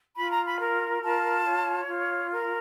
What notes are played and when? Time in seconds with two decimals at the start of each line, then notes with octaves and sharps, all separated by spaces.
0.17 F4 B5
0.30 A#5
0.45 B5
0.59 A#4
1.02 F4 A5
1.45 C#5
1.88 F4
2.31 A#4